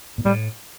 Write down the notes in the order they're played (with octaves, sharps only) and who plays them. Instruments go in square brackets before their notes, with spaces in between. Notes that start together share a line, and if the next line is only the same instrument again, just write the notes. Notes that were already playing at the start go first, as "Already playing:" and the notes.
[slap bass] A#2
[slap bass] A2 [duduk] G3